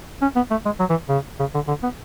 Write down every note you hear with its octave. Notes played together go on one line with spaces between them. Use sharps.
C#4
B3
A3
G#3
F#3
E3
C#3
C#3
D3
D3
B3